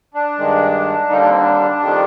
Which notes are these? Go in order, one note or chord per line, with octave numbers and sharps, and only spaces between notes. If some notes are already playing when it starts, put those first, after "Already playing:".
D4
G2 D#3 G#3
D#2 D3 G3 A#3 D#4
D4
C4
D4
F2 D#3 G3